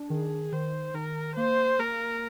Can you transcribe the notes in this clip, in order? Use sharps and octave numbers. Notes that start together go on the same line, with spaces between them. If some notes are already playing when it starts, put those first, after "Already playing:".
Already playing: D4
D#3 G#4
D#3 C5
D#3 A#4
A#3 C5
A#3 A#4